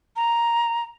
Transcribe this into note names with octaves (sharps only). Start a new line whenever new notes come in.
A#5